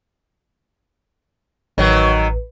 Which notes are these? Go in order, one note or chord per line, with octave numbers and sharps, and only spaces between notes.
A1 D#3 F#3 B4